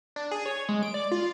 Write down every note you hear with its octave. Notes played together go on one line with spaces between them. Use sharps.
D4
G#4
C#5
G#3
D7
D5
F4